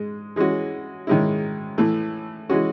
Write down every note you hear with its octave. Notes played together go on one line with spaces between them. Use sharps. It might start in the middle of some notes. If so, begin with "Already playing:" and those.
Already playing: G#2 G#3
E3 G#3 C#4 F#4
G#2 D#3 G#3 C#4 E4
A2 E3 A3
E3 G#3 C#4 F#4